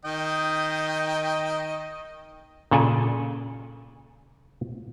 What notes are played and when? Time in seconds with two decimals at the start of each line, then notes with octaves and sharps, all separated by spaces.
0.05 D#3 D#5 G5
2.71 A#2 C#3 A4 D5 G#5